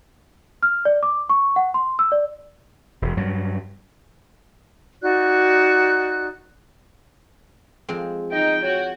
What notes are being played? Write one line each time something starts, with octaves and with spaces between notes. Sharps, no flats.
F6
D5
D6
C#6
F#5
C6
E6
D5
E1
G2 F#3
D#4 F#4 D5 F#6
F3 G#3 C4
D#4 D#5 G5
F#4 C#5